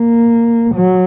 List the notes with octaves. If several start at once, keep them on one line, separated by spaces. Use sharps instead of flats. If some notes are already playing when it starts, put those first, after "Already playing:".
Already playing: A#3
F#3